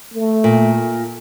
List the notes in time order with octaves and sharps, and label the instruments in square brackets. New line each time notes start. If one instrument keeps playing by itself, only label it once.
[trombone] A3
[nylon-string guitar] A#2